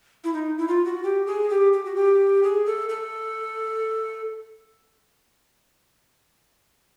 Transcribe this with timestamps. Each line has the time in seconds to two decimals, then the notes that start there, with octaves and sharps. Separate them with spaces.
0.24 E4
0.34 D#4
0.58 E4
0.68 F4
0.85 F#4
1.04 G4
1.26 G#4
1.50 G4
1.73 G4
1.85 F#4
1.96 G4
2.43 G#4
2.66 A4
2.89 A4